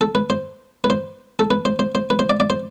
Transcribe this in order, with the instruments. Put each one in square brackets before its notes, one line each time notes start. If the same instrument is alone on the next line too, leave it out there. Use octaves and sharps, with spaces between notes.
[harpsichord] A4
B4
C5
B4
C5
A4
B4
C5
C5
C5
B4
C5
D5
D5
C5